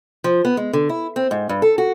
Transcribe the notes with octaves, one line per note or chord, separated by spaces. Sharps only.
F3
B3
G#3
D3
E4
C4
G#2
G2
A4
F#4